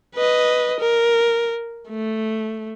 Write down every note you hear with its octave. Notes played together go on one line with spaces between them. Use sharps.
B4 D#5
A#4
A3